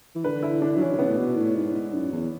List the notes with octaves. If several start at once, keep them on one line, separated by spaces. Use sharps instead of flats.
E3
D3 B4
E4
D4
F#3
E3 C#4
D3
C#3 B3
A2
B2
A2
G#2
G#2
F#2
E2